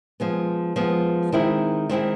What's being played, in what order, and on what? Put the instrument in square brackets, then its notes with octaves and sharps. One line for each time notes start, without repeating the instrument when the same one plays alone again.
[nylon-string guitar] F3 G#3 B3
F3 G#3 B3
D#3 G#3 C4 E4
D#3 G#3 C4 E4